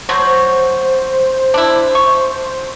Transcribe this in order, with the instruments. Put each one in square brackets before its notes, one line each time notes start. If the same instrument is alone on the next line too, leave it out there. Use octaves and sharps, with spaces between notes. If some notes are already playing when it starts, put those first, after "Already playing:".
[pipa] F#3 A3 F#4 [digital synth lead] C5
[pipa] D4 E4
C#6